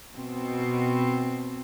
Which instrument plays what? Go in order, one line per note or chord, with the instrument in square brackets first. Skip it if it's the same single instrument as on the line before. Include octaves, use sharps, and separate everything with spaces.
[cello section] B2 C4